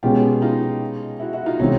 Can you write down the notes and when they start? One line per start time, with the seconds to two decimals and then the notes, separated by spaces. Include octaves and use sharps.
0.03 B2 G#3 C#4 F4 G4
0.42 D#4 F4
1.20 E4 F#4
1.33 E4 F#4
1.46 D#4 F4
1.59 C3 E3 G#3 C4 C#4 D#4